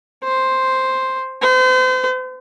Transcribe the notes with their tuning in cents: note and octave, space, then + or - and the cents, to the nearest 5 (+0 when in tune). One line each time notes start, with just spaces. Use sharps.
C5 +0
C5 -40